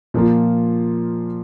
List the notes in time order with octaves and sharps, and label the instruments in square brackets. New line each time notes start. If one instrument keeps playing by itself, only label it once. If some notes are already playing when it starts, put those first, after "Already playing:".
[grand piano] A#2 F3 A#3 F4